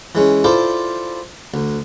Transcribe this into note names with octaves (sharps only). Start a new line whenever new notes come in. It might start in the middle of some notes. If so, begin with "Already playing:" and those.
E3 G#3 C#4
E4 F4 A4 C5 D5
D2